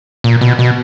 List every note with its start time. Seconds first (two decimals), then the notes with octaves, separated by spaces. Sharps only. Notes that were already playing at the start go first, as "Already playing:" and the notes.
0.24 A#2
0.41 B2
0.59 B2